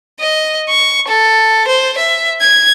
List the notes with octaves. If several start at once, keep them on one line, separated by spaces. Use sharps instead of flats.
D#5
C#6
A4
C5
E5
G#6